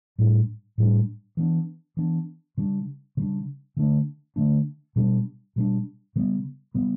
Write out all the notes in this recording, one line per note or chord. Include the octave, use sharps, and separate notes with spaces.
A2 G3 D4
A2 G3 D4
E3 B3 D4
E3 B3 D4
C#3 G3 D4
C#3 G3 D4
D3 A3 D4
D3 A3 D4
B2 G3 D4
B2 G3 D4
C#3 G3 B3
C#3 G3 B3